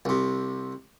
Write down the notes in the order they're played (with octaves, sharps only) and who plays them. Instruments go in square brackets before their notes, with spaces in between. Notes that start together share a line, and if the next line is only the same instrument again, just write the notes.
[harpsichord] C2 C3